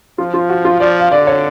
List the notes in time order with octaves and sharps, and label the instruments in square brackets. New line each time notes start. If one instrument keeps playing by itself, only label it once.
[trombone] F3 [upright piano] F4
[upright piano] F4
F#4
F4
[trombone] F3 [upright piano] D5
[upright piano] F5
[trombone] D3 [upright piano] D5
[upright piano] C#5